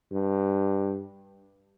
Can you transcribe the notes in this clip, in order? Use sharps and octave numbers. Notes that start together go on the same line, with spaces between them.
G2